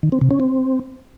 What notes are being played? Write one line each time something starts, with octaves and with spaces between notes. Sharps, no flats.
D#3
C4
C3
C#4
C4